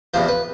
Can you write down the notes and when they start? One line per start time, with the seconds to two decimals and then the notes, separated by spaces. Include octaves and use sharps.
0.14 E2 C3 F3 C5
0.29 B4